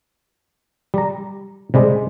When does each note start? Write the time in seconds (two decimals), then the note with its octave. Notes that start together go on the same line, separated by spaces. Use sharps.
0.94 G3 A#5
1.74 C3 G3 G#3